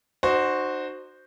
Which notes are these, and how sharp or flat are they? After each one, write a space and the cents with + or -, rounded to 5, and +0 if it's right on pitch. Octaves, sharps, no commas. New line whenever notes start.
D#4 -45 F#4 +0 C5 +0